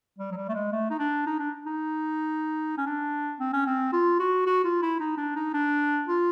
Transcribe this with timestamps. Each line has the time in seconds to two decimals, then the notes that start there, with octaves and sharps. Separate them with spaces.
0.19 G3
0.31 F#3
0.37 G3
0.49 A3
0.54 G#3
0.72 A3
0.91 D#4
0.99 D4
1.26 D#4
1.39 D4
1.66 D#4
2.77 C#4
2.86 D4
3.40 C4
3.53 C#4
3.67 C4
3.93 F4
4.19 F#4
4.46 F#4
4.64 F4
4.82 E4
5.00 D#4
5.18 D4
5.36 D#4
5.54 D4
6.08 F4